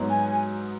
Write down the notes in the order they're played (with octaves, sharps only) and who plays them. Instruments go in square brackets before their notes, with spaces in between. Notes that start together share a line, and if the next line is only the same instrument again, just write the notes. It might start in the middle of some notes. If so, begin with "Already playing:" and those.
Already playing: [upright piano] G#2 F#3 B3 D#4
[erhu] G#5